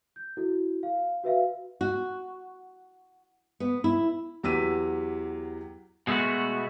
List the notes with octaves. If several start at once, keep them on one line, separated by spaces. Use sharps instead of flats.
G6
E4 F#4 A4
F5
F#4 B4 E5 F5
F#4
B3
E4
E2 F#3 G4 E6 B6 D#7
B2 G#3 A3 B3 F#4